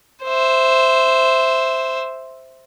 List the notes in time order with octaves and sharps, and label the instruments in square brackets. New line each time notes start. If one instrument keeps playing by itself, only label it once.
[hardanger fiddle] C5 E5